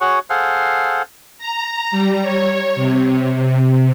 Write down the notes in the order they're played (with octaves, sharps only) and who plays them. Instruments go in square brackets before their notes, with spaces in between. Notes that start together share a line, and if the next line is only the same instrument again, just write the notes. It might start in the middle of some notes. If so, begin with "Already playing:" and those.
[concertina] F#4 G#4 C#5 F#5 C#6
G#4 A4 C5 F5 F#5
[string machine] A#5
G3
C#5
C3
C3